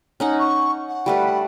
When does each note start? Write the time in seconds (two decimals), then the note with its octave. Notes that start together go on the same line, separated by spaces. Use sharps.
0.20 C#4 D#4 F#5
0.40 C#6
0.88 F#5
1.06 G3 A3 B4